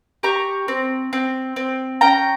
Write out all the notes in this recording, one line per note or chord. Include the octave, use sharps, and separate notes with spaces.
G4 A#5 C#6
C4
C4
C4
C#4 G5 A#5